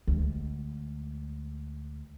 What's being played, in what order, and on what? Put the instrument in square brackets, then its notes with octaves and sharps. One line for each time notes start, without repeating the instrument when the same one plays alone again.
[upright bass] D2 G#3